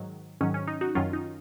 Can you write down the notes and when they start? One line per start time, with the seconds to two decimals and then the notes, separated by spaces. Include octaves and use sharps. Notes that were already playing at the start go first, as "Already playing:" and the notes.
Already playing: G#2 D#3 F#3
0.41 G#2 D#3 F#3 C#4
0.54 C#4
0.68 D#4
0.81 D#4 F#4
0.95 F#2 D#3 F#3 C#4 F4
1.13 D#4